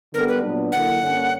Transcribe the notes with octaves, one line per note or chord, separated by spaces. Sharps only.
D3 G3 B3 A#4
B4
A#2 F#3 B3 D4
D3 F#3 A#3 E4 F#5
G2 D3 A#3 C#4